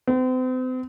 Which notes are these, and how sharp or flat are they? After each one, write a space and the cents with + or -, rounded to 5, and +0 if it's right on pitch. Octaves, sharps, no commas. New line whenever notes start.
C4 -40